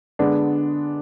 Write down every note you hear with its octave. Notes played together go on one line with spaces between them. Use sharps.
D3 G#3 B3 D4